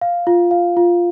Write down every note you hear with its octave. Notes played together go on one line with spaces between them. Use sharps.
F5
F4
F5
F4